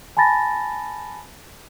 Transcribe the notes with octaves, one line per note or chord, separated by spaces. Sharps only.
G#5 A5 B5 A6 A#6